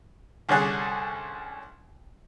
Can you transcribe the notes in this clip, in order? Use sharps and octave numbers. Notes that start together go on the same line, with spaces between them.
C2 D3 G3 C#4 G#4 F#6